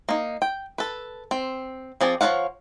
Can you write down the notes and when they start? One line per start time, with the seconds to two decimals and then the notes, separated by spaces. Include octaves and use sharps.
0.09 A#3 D#4
0.42 G5
0.78 A4 B4
1.31 C4
2.01 F3 C4 G#4 D5
2.21 F3 D#4 C#5 F5 F#5